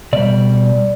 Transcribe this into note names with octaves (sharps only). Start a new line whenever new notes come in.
B2 G3 D5